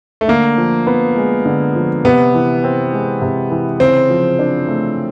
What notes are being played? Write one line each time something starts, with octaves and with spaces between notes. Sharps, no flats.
A3
D3 A#3
F3
B3
G#3
D3
F3
C3 B3
E3
C4
G#3
C3
E3
C#3 C4
F3
D4
A3